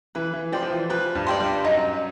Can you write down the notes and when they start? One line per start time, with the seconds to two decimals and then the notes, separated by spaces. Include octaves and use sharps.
0.15 E3 B4
0.33 E3
0.52 F3 D5 G5 C6
0.63 F3
0.70 E3
0.90 F3 B4
1.15 G2 G3
1.27 D5 G5 C6
1.40 G2 G3
1.64 F#2 F#3 D#4